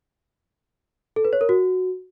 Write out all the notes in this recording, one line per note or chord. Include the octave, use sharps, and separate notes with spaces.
A4
B4
C#5
A#4
F#4